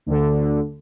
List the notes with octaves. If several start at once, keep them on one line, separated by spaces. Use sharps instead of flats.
D2 D3